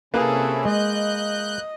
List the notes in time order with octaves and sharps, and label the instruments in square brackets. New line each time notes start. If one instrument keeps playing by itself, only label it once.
[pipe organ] C3 C#4 E4 [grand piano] A#3 B4 [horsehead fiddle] G#4 A4
[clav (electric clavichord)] G#3 [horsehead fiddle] D#5 [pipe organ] F#6 G6